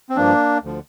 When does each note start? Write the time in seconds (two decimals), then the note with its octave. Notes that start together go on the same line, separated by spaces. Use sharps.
0.10 C4
0.16 G2 F3 A#3 D4
0.63 D2 D3 F3